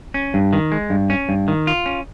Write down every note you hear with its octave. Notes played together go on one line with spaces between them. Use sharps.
C#4
G2
D#3
G#3
G2
C#4
G2
D#3
F4
C#4